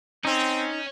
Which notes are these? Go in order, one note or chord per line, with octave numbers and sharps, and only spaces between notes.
C4 C#4 D#4